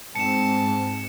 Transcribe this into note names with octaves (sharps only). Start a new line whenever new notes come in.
G#2 C4 A5 C#7 E7